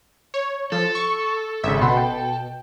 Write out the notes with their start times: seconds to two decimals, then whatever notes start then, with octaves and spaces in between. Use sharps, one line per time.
0.34 C#5
0.72 F3 A4
0.95 C#6
1.64 G#1 C#3 E5
1.81 B2 F#5 B5 C6
1.97 G5